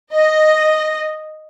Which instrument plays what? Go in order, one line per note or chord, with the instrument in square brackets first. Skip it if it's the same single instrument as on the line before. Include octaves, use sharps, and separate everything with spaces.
[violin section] D#5